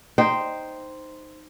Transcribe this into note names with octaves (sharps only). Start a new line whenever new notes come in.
D#4 C5 G5